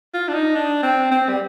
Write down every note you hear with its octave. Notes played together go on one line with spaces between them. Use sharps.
F4
D4
D#4
D4
C4
C4
G3